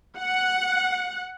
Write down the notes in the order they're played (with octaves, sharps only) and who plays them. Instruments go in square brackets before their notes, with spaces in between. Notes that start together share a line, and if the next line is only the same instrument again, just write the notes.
[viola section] F#5